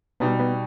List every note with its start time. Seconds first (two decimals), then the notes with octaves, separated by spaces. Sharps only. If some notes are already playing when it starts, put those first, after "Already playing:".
0.20 B2 G3 B3 D#4
0.40 B3